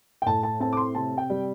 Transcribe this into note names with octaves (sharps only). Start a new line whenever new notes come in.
G5
A2 A5
A5
C4 A5
D6
C6
C3 A5
G5
G3